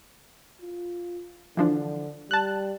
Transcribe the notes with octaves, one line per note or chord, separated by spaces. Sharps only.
F4
D3 E3 F3 D4
G3 A5 F#6